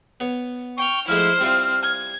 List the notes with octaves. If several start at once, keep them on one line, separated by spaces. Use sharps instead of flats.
B3 C#5
G5 C#6 F6
F3 G#3 A3 E4 C5 F6
G3 C4 E4 F4
G#6